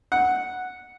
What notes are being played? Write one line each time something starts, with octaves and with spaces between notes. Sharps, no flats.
F#5